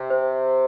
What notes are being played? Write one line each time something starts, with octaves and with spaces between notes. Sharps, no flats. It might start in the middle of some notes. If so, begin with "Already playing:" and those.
Already playing: C3
C5